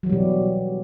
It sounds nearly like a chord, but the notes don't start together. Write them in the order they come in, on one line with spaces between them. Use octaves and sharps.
F#3 E3 G3 B2